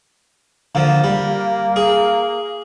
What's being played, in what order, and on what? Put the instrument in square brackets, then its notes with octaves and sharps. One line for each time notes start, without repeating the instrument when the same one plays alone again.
[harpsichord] D3 F3 [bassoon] A#3
[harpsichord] G3
G#4